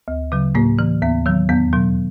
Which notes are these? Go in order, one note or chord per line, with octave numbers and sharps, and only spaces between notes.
D2
C#3 F#3
A2 A#3
E3
D#2 B3
D#3 F#3
E2 B3
B2 F#3